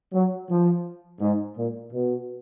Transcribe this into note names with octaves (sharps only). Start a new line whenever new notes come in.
F#3
F3
G#2
A#2
B2